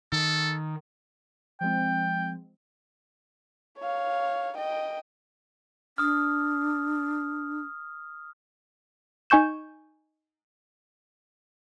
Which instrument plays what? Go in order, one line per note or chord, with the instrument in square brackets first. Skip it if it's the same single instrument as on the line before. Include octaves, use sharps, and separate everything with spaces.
[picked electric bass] D#3 [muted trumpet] A4
[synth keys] F3 G#3 C4 [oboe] G5
[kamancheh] C#5 F5
D#5 G5
[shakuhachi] D4 [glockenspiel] D#6 F6
[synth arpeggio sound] D#4 G#5 C#6 G6 E7